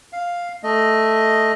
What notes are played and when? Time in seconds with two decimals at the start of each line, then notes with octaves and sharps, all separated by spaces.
0.13 F5
0.63 A3 D#5